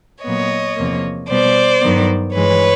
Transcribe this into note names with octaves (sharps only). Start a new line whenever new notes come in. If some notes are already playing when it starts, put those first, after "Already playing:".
A#2 F#3 B3 C#5 D#5
E2 C3 F3 A#3
B2 G3 B3 C5 D5
G2 D#3 F#3 B3
G2 E3 G#3 B4 C#5